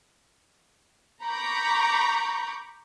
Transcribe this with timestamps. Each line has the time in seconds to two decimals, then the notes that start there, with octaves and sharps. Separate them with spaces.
1.24 A#5 B5 C#6 D6 G6